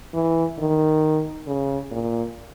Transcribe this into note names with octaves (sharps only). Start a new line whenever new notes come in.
E3
D#3
C#3
A#2